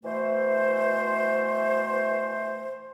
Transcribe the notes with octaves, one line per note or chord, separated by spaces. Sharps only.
B2 E3 A3 C5